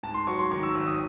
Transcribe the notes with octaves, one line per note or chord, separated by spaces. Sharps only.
G#2 A5
C6
F#3 C#6
C6
D#3 C#6
E6
G#1 E6
D#6